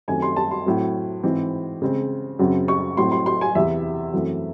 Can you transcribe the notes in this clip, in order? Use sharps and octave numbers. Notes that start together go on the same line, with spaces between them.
F#2 D#3 A3 C4 G#5
C6
A5
C6
A2 F#3 C4
G#2 E3 C4
C#3 G#3 C4
F#2 C#3 F#3 C4
C#6
A2 F#3 C4 C6
C6
C6
G#5
E2 C3 E3 E5
F#2 E3 A3 C4